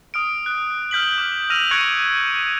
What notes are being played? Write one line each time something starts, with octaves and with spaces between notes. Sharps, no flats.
D#6 F6 D7
F#6
F6 G6 B6 F#7
D6 F6
E6 F6 A#6 D#7 F7 F#7
C#6 F#6 G#6 A#6 C#7 D7